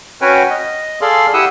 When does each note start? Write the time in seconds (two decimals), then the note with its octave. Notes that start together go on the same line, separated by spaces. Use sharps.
0.21 C#4 F#4 B4 C#5 G5 G#5
0.50 D#5
1.01 G#4 A4 D5 F5 C6
1.33 E4 G4 F#5 D#6 E6